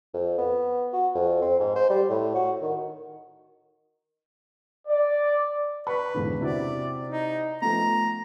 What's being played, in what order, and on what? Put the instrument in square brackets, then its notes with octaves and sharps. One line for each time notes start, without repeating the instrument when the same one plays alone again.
[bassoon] F2
B3
F#4
F2
C4
G#2
C5
G3
A2
F#4
D#3
[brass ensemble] D5
[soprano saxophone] B4 [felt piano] B5 C#6
[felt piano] G#1 E2 D3
[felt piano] C3 E4 F#4 [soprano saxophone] D5
[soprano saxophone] D#4
[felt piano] F3 A3 B3 [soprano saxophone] A#5